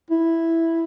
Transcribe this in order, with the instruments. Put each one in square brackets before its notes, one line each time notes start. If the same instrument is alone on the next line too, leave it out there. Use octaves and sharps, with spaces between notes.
[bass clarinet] E4